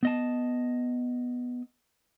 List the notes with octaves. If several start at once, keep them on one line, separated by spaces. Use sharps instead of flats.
B3 D#5 A5